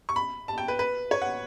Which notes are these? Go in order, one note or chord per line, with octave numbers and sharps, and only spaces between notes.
C#6
B5
A5
G5
B4
B4
C#5
F#5